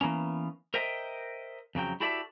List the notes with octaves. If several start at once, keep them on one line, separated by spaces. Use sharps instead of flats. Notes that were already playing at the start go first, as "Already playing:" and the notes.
E3 A#3 B3 C#4
A#4 C5 D#5 E5 G5
F2 C#3 F#3 G5
E4 F#4 G4 A4 D5 E5